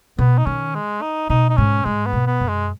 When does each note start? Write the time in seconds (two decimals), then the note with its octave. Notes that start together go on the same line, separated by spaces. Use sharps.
0.18 B2 B3
0.38 D#4
0.46 D#3 C#4
0.75 G#3
1.02 D#4
1.30 B2 D#4
1.50 D#4
1.57 G#2 C#4
1.85 G#2 G#3
2.06 B3
2.13 B2
2.27 B3
2.41 F#2
2.49 G#3